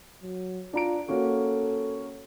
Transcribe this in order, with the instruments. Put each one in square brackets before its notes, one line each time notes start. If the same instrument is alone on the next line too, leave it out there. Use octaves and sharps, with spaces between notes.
[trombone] F#3
[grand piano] D4 A#5 D7 [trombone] F4
[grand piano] A#3 C#4 F#4 [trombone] A4